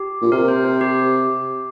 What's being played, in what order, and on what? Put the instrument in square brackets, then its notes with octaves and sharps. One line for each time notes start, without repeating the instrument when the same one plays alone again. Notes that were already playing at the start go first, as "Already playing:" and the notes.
Already playing: [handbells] G4
[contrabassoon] A#2
[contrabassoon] C3 [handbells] A#4
[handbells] C5
C5
G4